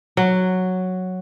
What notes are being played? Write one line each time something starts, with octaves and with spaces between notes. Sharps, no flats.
F#3